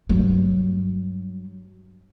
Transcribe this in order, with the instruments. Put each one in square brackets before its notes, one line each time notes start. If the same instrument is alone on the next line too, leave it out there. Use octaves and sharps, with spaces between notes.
[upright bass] G2 F#3